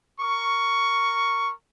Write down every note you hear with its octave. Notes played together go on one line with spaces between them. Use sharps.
A#4 C#6